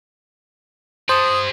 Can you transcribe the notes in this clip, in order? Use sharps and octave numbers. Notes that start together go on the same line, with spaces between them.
G4 C5 A5 D#6